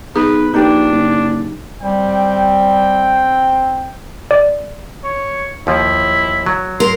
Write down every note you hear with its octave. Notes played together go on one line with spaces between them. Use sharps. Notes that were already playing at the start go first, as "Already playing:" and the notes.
B1 D#4 G#4 B4
A#1 D4 D#4 G4 B4
F#1
G3 C4 G5
D5
C#5
D#2 F3 E4
F#3
A#4 C6